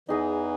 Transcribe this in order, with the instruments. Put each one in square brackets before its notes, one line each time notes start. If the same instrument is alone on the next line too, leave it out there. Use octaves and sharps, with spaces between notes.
[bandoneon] E2 E3 [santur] D#4 G#4 D#5